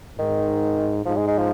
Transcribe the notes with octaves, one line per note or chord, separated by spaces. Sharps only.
G#2 D#3
G#2 F3
G#3
G#3
F3